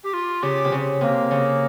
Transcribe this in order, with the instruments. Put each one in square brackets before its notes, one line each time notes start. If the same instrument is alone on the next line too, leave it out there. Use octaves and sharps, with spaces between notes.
[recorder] G4
F4
[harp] C#3 [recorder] G4
[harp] C3
C#3
[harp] C3 [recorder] A#3
[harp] C#3